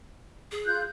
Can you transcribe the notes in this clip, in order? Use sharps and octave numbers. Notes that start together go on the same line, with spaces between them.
G#4
F4 F#6 G6